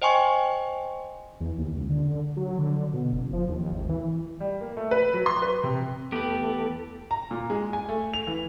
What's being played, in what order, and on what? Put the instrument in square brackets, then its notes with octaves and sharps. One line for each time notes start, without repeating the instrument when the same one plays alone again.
[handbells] C5 D#5 G5 G#5 C6 C#6
[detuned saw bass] E2
D#2
C#2
D3
F#3
D3
B2
F#1
F3
D#2
G#1
E3
[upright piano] G3
A#3
A3
B4
F#3
C6
B4
C3
[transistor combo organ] E2 A3 A4 [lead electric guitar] B3 B4 [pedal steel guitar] G4
[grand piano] A#5
A#2
G#3
G#5
A3
F7
E3